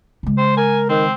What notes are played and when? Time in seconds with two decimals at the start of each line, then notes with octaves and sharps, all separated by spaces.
0.23 C#3 G#3
0.38 C5
0.57 A#4 G#5
0.89 D#3 C4